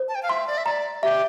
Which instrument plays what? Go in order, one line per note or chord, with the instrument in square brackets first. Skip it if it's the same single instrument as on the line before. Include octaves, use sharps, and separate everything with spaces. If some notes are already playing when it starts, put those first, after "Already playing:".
Already playing: [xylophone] C5
[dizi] A5
G5
F5
[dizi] E5 [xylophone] C6
[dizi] D5
E5
[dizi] D5 [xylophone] A#5
[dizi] G4 [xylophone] E5